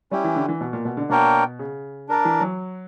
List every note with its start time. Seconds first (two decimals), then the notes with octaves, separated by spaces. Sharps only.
0.11 G3 C#4 E4 G4
0.24 E3
0.36 D3
0.49 E3
0.61 B2
0.73 A#2
0.85 B2
0.97 D3
1.09 B2 A#3 D4 A#4 C#5 G5
1.59 C#3
2.08 D4 A#4 D5
2.25 E3
2.40 F#3